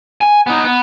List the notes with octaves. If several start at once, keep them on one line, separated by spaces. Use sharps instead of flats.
G#5
B3 D#4
B3